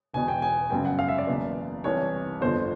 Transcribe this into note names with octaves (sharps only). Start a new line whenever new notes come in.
E1 E2 B2 G#5
G5
G#5
G1 F#2 C#3 G5
F#5
F5
E5
D5
F#1 E2 B2
C2 C3 E3 C#5
G1 F2 D3 C5